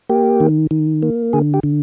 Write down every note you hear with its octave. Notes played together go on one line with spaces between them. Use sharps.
A#3 G4
D#3
D#3
A#3
D3 G#4
G4
D3